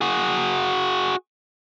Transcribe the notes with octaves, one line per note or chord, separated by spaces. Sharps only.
F#4 G#4